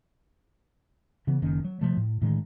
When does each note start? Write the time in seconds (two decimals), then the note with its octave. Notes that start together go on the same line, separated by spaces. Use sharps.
1.27 C#3 E3 B3
1.42 F#1 D#3 A#3 C#4
1.64 F#3
1.81 C3 F3 G3 A3
1.97 A2
2.22 A2 D3 D#3 G#3